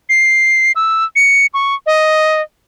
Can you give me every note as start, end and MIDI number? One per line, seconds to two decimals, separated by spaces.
0.09 0.72 96
0.76 1.05 88
1.16 1.46 97
1.54 1.75 85
1.86 2.41 75